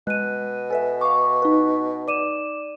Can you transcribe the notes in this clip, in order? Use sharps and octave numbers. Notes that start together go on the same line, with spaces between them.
B2 G#3 F#6 D#7
A4 B4 E5 G#5
F5 C#6 D6
D#4 B4
D5 D6 D#7 E7